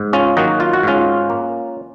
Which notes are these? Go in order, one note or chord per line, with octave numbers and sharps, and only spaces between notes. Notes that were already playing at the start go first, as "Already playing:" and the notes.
Already playing: G#2
C#4 F4
D#3 F#3 A#3 D#4 F#4
F4
F#4
G#2 C#4 F4
A#3